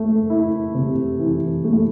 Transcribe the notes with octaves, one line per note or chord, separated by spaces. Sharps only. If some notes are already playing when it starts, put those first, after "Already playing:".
Already playing: A3
E4
C3
E3
A3